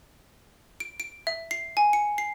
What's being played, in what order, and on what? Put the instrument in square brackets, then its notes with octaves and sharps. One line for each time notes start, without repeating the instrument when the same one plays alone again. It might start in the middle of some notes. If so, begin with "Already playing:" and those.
[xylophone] D7
D7
E5
C7
G#5
C#7
C7